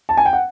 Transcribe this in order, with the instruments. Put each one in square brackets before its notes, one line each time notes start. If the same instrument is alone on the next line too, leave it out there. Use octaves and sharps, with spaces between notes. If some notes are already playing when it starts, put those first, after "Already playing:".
[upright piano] A5
G#5
G5
F#5